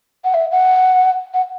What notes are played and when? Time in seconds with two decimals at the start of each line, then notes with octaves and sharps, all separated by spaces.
0.24 F#5
0.34 E5
0.52 F#5
1.34 F#5